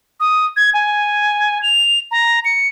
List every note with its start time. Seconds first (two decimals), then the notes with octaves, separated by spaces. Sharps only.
0.20 D#6
0.57 G#6
0.74 G#5
1.63 F7
2.11 A#5
2.45 C#7